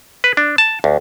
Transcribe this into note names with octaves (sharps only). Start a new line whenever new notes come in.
B4
D4
A5
D2